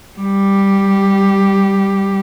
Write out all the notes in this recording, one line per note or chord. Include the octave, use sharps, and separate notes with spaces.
G3 G4